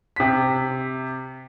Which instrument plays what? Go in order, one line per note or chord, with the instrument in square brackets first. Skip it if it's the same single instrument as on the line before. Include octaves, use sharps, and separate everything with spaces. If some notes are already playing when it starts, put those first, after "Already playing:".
[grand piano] C3 B6